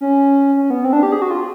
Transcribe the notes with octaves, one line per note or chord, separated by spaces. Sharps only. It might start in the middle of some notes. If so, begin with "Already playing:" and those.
C#4
C#4
B3
C4
D4
G4
G#4
F#4
F4